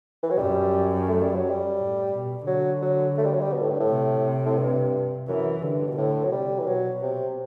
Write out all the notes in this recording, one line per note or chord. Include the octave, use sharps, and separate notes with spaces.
E3
F#3
F#2 G3
A3
G3
F#3
G3
A2
B2
D3 F#3
F#3
A3
G3
F#3
G3
B2
A2
G2
A2
C3
A2
G2
F#2 E3
G2 D3
B2
A2 D3
F#3
C3 G3
E3
B2 F#3
C3